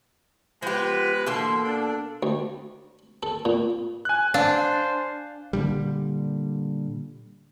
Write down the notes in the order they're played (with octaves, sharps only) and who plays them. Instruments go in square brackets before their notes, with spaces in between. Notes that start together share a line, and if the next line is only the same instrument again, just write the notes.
[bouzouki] F3 G4 [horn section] G#3 B3 B4
[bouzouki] B2 A#3 A4 [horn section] D3 E3 C6
[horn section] D4
[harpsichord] D2
A4
A#2
[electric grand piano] G#5 F#6
[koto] D4 [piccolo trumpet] C5 [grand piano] F5
[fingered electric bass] A#2 D3 G3